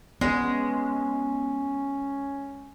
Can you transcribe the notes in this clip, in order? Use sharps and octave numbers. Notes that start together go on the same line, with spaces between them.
G#3 B3 C#4